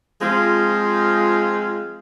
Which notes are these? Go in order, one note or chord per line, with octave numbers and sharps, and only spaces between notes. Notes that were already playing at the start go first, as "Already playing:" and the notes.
F3 G#3 C4 F4